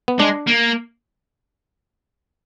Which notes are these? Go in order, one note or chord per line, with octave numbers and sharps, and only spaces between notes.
B3
G#3 D4
A#3